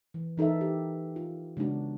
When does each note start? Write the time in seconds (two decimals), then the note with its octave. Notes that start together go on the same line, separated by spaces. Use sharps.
0.14 E3
0.38 E3 D#4 A4 A#4 E5
0.61 G4
1.16 F4
1.57 C#3 G#3 B3 D4 F#4